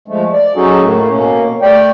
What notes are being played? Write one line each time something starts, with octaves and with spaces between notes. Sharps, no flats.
F3 G#3 A3
D5
F#3 C#4 D#4 F#4 G#4 A4
A2 A3 A#3
B2 A#3 C#4
A3 D5 G5